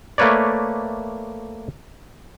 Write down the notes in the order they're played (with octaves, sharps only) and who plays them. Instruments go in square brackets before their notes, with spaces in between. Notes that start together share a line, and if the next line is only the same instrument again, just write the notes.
[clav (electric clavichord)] A3 A#3 B4 C#5 D5